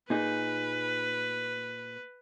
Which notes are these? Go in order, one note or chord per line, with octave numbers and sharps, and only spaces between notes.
A#2 D#4 G#4 B4